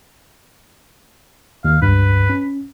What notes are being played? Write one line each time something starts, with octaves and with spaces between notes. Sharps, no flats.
D#2 F5
C#2 G2 B4
C#4